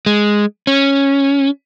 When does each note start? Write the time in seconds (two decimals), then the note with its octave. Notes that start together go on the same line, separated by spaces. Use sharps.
0.06 G#3
0.67 C#4